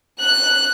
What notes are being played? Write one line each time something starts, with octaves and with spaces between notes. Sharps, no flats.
F#6